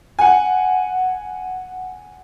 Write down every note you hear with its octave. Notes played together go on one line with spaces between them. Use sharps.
F#5 G#5